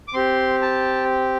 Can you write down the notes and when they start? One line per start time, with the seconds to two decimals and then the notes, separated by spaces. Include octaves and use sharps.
0.08 D6
0.14 C4 G4 C6
0.62 A5